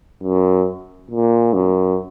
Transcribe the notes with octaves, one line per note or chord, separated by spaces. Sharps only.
F#2
A#2
F#2